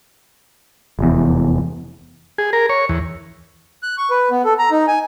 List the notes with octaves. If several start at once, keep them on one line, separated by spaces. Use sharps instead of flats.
F1 E2
G#4
A#4
C#5
E2
F#6
C#6
B4
B3
A4
A#5
D#4
G#5